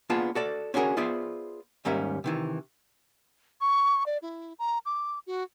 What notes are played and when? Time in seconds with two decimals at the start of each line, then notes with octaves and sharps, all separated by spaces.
0.10 A#3 B3 D4 F4 G#4 A5
0.35 F#4 A4 D5
0.74 C#4 D4 F#4 G#4 A#4
0.97 B3 F4 G#4 C5 D5 E5
1.85 D#2 G#2 G3 C#4 A#4 E5
2.24 C3 D#3 E3
3.61 C#6
4.06 D5
4.22 E4
4.59 A#5
4.86 D6
5.27 F#4